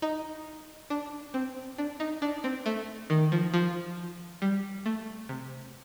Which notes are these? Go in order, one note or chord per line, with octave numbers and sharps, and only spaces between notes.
D#4
D4
C4
D4
D#4
D4
C4
A3
D#3
F3
F3
G3
A3
C3